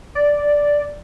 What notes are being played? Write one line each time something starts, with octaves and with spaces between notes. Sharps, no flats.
D5